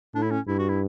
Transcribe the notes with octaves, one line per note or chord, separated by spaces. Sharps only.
A2 D4
E4
C#4
G2 E4
F#4
E4